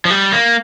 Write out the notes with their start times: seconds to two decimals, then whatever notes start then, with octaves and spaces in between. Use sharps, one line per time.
0.05 F3
0.10 G3
0.32 A#3